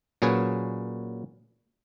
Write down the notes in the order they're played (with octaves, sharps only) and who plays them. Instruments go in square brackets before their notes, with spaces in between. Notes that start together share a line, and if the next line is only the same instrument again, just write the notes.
[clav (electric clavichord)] A#2 F#3 C#4 G#4 B4 G#5